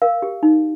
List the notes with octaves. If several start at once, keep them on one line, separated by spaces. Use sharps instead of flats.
A#4 F5
G4
D#4